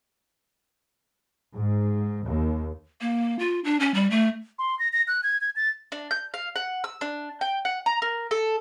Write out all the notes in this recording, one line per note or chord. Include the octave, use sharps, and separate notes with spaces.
G#2
D#2
A#3
F4
D4
C#4
G3
A3
C6
A#6
A#6
F#6
G#6
G#6
A6
D4
G6
F5
F#5
E6
D4
G5
F#5
A#5
A#4
A4